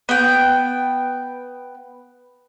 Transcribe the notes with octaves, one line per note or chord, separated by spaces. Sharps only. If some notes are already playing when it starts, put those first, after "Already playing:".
B3 G5